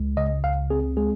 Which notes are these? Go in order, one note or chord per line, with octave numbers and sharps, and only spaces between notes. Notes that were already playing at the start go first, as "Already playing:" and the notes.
Already playing: C#2 G#3
C#3 D#5
C#2 F5
C4 G#4
G#3 G#4